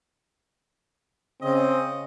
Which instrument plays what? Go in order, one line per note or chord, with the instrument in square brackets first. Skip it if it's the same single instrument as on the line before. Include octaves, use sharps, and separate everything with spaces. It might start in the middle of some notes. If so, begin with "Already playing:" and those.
[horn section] C#3 D#5 [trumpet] C4